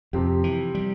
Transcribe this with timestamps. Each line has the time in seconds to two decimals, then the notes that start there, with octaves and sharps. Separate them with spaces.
0.13 F2 C3 F3 C4 G4
0.44 E3
0.75 G3